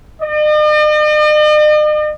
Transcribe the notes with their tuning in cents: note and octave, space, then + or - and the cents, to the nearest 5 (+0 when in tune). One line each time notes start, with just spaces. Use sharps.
D#5 -45